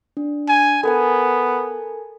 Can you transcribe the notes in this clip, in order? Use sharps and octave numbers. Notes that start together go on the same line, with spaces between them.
D4
G#5
B3 A4 A#4 G#5